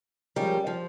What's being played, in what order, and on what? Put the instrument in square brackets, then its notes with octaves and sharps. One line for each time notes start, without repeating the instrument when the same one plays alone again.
[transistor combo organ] F3 G#3 C#4 G4 A#4 [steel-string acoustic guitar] G3
[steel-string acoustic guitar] F3